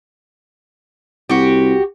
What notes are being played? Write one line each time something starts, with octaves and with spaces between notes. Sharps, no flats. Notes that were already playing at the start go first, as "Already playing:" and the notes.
C2 F#4 G4